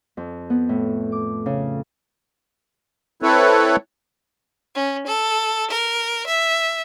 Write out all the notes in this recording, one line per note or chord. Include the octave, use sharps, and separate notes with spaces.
F2
B3
A2
D6
C#3
C4 E4 A4 B4 C#5
C#4
A4
A#4
E5